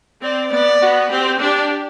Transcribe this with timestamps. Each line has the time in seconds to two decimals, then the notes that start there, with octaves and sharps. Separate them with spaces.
0.22 C4 D5
0.52 B3 D5
0.81 B3 F#4
1.11 C4 G4
1.40 D4 G4